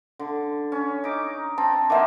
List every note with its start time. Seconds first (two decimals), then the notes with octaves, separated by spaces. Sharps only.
0.19 D3
0.72 C#4
1.04 D#4 D6
1.58 C4 A5
1.90 D#3 A#3 C5 E5 F#5 D6